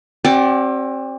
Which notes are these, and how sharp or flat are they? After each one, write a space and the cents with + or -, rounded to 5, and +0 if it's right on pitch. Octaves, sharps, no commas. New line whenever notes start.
C4 +30 G4 -45 D5 +0